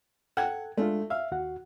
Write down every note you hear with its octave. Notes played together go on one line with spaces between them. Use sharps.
A4 F#5 G5 G#6
G#3 A3 D4 F4
E5 F5
D#2 F#4 F#5